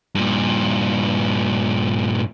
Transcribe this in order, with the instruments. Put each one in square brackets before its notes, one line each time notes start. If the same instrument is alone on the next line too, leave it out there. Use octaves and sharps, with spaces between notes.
[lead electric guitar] G2 A#2